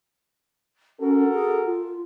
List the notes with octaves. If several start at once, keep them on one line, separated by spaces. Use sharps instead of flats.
C#4 F#4 A4 A#4
G#4
F4